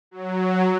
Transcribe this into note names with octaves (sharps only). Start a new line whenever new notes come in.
F#3